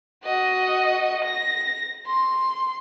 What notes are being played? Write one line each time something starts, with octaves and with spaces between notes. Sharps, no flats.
F#4 D#5
A#6
C6